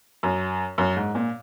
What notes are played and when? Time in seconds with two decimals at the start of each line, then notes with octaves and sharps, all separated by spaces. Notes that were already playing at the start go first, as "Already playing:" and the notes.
0.23 F#2
0.78 F#2
0.97 G#2
1.15 A#2